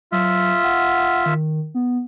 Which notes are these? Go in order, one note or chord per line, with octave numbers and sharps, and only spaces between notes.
F#3 F4 E5
F#5
D#3
B3